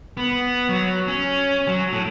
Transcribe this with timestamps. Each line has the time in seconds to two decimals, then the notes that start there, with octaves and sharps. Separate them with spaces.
0.17 B3
0.69 F#3
1.08 C#4
1.67 F#3
1.93 A2